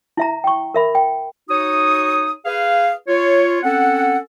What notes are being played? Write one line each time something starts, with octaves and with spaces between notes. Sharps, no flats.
E4 E5 A#5
G5 C#6
A#4 E5 B5
G5
D#4 F#4 C#5 D#6
G#4 B4 F5
F4 C#5
C4 C#4 A4 F#5